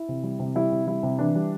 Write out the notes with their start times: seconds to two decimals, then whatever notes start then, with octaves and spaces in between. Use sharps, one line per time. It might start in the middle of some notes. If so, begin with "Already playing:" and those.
Already playing: E4
0.09 C3
0.23 G3
0.39 C3
0.55 G3 E4
0.72 C3
0.87 G3 E4
1.03 C3
1.19 E3 D4
1.35 G3